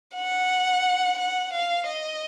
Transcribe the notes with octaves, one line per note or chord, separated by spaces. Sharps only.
F#5
F#5
F5
D#5